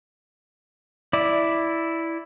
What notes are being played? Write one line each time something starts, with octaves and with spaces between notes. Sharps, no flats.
E4 D5